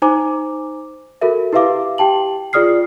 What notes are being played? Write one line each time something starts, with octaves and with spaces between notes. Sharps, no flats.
D#4 C5 G#5 A#5 D6
F#4 A4 A#4 E5
E4 G4 B4 E5 F5 D6
G4 G5 A5 F#7
F4 G#4 D5 D#6 F6 C7